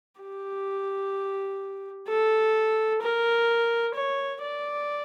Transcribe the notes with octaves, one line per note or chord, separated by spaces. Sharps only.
G4
A4
A#4
C#5
D5